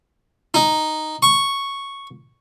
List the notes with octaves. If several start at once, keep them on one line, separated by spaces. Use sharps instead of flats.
D#4
C#6